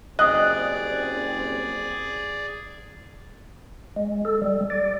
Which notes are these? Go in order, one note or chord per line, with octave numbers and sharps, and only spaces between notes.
F#1 G3 C4 G#4 D5 D#5 F#6
G#3
A4
G3
D5